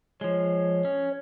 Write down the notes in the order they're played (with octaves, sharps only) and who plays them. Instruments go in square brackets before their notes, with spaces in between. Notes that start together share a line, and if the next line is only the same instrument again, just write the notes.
[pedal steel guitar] F3 G#3 [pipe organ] C#5
[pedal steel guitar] C#4